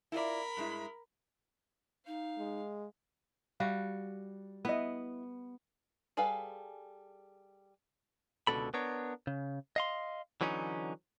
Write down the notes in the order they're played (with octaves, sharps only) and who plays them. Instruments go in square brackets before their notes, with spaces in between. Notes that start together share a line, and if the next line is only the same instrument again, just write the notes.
[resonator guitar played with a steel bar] E4 F4 D5 [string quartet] A#4 B5
[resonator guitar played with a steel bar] G2 G#3 E4
[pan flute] D#4 [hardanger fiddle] F5
[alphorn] G#3
[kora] G3 F#4 [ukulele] F5
[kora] B3 [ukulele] E4 B4 D#5
[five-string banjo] G3 G#4 A4 B4 F5
[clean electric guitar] C#2 B2 D3 C4 A4 B5
B3 D4 A#4 C#5
C#3
D#5 F5 C6
D3 E3 F#3 C#4 D#4